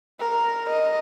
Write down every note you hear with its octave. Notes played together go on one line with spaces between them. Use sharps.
A#4
D#5